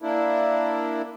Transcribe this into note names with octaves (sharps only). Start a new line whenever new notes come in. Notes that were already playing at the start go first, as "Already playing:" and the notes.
A#3 D4 E4